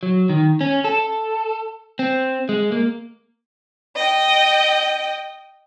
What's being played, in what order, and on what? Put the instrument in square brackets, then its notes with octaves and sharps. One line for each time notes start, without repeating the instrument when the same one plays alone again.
[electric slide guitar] F#3
D#3
C#4
A4
C4
G#3
A#3
[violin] D#5 G5